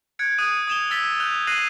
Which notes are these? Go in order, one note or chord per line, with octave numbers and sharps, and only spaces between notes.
F#6 G#6 C#7 D7
D#6 F#6 D#7
D#6 G#6 E7 F7 G7
E6 G#6 A6 B6 G7
F#6 G6 F7 G7
F#6 A#6 C7 D#7 F#7